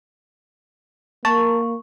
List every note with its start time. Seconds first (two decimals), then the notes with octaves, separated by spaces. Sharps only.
1.25 A#3 A#4 A5 C#6